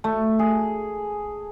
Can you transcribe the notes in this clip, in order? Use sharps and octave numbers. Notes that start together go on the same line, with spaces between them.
A3
G#4